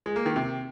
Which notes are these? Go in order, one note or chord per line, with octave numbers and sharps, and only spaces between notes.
G#3
A#3
D#3
C3